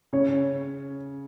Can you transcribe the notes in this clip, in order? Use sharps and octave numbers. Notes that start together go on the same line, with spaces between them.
C#3 C#5